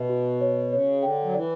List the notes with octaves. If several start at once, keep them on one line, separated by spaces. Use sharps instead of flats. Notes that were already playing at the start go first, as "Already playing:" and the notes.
Already playing: B2 E5
F#4
C#5
C#3 C#5
D3 G5
F#3
E3 D5